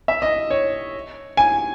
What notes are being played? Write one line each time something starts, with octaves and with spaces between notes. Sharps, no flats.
E5
D#5
C#5
G#5